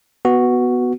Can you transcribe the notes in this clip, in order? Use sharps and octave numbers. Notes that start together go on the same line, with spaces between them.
B3 F#4